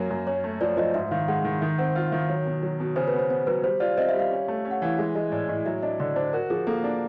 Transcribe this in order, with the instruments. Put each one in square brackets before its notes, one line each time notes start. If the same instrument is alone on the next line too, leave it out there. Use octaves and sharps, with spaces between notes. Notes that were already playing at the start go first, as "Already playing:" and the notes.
Already playing: [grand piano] F#2 F#3 A#3 [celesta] A#4
[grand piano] F#2
[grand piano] C#4 [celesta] C#5
[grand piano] A3
[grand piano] F3 [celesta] D5
[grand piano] F3 [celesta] D#5
[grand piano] G#2 [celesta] E5
[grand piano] D#3 [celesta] F5
[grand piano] G#3 [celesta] F#5
[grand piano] D#3 [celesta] F#5
[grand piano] D#3 [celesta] E5
[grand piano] C4 [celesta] F#5
[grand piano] F4 [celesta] F5
[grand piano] D#3 [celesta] E5
[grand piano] F#3 [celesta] C#5
[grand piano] B2
F#3
B2
[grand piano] C#3 [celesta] C5
[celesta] B4
[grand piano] B3
[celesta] C5
[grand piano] B3 [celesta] C5
[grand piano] F#3 [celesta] B4
[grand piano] G3 [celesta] C5
[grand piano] F4 [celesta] D5
[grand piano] C4 [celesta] D#5
[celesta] E5
[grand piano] G3
[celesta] F5
[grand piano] C#4
A3
C#4
[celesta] F#5
[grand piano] E3 [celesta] F5
[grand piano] G#3 [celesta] E5
[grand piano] G#3 [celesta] D#5
[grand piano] A2 [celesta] D5
[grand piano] A2 [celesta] D#5
[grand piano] F#3 [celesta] E5
[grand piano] D4 [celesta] D#5
[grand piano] D3 [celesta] D5
[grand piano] D4 [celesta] C5
[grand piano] F#4 [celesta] A#4
[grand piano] F3 [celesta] G#4
[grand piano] A#3 [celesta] A4
[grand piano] D4